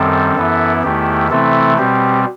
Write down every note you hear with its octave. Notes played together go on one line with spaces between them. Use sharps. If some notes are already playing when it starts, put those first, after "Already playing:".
Already playing: F#2 D#3 G3 C4 A4
F#2 E3 B3 E4
E2 D#3 A3 E4 G4
C3 E3 A3 C4 E4 A4
B2 G3 C4 G4